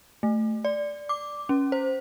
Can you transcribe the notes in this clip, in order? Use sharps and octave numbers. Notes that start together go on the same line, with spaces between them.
A3
D5
D6
C#4
C5